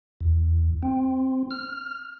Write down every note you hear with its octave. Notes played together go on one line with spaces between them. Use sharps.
E2
C4
F6